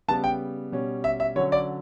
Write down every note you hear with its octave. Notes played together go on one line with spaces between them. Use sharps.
C#3 G3 B3 A5
G5
B2 G3 C#4
E5
E5
D3 F#3 C#4 C#5
D5